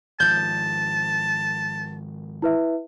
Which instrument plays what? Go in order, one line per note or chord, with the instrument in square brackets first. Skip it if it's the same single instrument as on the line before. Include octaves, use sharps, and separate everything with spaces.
[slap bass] G#1 F3 [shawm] A5 [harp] G6
[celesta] E4 B4 E5